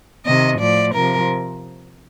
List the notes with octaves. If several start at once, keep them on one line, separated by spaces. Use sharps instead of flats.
C3 D#3 D#5
A2 F3 D5
C3 F3 A#4